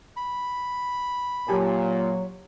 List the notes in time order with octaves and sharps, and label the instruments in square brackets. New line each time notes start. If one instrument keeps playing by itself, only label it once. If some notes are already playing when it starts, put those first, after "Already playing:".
[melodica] B5
[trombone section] A#2 [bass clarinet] F#3 [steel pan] G4 G#5 A5